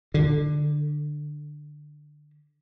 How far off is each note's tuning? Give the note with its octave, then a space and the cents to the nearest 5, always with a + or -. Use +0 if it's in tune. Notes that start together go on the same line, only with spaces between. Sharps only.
D3 +15